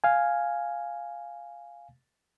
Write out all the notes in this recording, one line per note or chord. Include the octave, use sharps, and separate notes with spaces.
F5 G#5